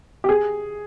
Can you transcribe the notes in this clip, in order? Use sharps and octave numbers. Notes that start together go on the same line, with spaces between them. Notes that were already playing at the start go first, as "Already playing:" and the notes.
G4
G#4